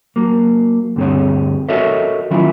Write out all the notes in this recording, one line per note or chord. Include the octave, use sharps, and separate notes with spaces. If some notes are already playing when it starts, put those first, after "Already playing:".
F#3 A#3
D2 G2 C4 G#4 C#5
F#4 A4 A#4 C#5 D#5 E5
D#3 F#3 C#4 E4 F4